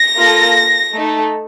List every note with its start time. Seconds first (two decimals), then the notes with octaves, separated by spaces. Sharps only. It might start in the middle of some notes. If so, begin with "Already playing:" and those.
Already playing: A#6
0.18 A#3 F4 A4
0.95 A3 D#4 A4